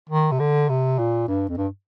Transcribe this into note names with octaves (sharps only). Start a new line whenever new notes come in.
D#3
C3
D3
C3
A#2
G2
F2
G2